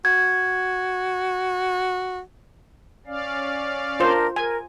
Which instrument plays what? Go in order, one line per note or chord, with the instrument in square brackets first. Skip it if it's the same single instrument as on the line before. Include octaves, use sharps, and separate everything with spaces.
[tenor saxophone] F#4 [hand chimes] G#6
[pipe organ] C#4 D5 F5
[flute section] D4 A#4 [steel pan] F4 C5
[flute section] A#4 [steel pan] G#5